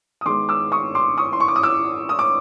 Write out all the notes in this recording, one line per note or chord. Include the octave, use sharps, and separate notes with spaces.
D#6
D#3 G#3 B3 C6 D6
D6 E6
C#6 D#6
C6 D6
C#6 D#6
C6
C#6
D6
D#6
D6 E6
D#6
D6